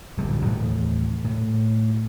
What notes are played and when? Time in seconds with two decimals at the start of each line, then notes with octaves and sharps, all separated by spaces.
0.17 D1 A#1 G2 G3
0.45 D#2 A2 E3 F3
1.24 A2